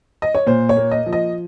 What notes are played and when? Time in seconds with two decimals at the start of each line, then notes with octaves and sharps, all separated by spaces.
0.22 D#5
0.35 C#5
0.47 A#2 C5
0.69 C#5
0.77 A#3
0.91 D#5
1.06 F3
1.13 D#5